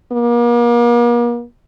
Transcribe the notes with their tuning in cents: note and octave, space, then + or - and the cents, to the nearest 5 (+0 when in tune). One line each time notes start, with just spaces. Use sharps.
A#3 +40